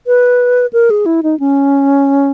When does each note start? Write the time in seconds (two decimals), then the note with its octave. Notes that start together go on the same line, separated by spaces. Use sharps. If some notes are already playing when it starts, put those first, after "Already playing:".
0.07 B4
0.73 A#4
0.90 G#4
1.06 E4
1.23 D#4
1.40 C#4